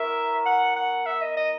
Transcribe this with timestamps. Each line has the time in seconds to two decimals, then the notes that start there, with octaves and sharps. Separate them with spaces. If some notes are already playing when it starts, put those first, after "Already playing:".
Already playing: B3 E4 A#4 C#5 E5
0.46 F#5
0.76 F#5
1.06 E5
1.22 D#5
1.37 D#5